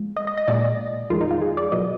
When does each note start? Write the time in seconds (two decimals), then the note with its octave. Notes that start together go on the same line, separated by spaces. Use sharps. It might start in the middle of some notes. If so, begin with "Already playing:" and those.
Already playing: F3 G#3
0.17 D#5
0.27 D#5
0.37 D#5
0.48 A#2 G#3 D5
1.10 F2 D#3 G#3 F4
1.21 D#4
1.31 F4
1.42 G#4
1.57 D5
1.72 B2 F#3 D#5